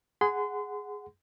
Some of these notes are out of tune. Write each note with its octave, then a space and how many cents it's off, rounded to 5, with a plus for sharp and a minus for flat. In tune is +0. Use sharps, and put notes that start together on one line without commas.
G#4 +0 F#5 +0 C6 -30